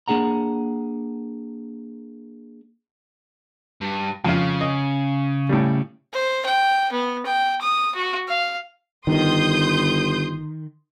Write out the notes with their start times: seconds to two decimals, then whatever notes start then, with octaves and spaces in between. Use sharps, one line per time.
0.08 A#3 D4 G#4 F#5 A#5
3.81 G2
4.25 F2 C#3 F4
4.61 D#5
5.49 A2 G3
6.13 C5
6.45 G5
6.92 B3
7.26 G5
7.61 D#6
7.95 F#4
8.28 F5
9.07 G1 D#3 C6 D#6 G6